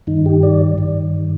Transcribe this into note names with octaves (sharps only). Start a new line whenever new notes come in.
G2 D#3 D#4
G4
D5
G2 D#3